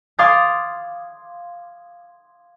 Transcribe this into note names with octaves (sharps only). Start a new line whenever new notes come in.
F5 C6 D6 D#6 G#6 A6